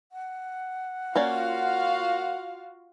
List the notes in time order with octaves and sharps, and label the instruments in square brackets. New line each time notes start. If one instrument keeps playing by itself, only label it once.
[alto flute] F#5
[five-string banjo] A#3 C#4 D5 [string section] F4 F#4 F5